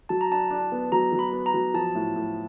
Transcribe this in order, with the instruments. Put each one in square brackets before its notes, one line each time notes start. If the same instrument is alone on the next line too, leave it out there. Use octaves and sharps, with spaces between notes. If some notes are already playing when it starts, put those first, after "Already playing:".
[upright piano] F#3 [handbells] A5
[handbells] A#5
[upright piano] D4 [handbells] A5
[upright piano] D4
B3
[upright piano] F#3 [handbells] A#5
[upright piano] F#3
[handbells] B5
[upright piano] B3
[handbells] A#5
[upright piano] F#3
[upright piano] F3 [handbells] A5
[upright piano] A2
A2